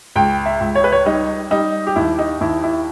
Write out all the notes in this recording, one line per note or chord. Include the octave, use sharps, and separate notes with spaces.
C#2 G5
E5
C#2
C#5
B4
C#5
G3 D#4
G3 D#4
G4
D#2 E4
D#4
D#2 E4
E4